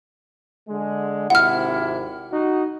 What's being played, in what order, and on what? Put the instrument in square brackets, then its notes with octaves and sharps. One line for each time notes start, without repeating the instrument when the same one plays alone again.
[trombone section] D3 G#3
[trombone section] G#1 C3 E4 [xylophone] F#5 F6
[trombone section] D#4 F#4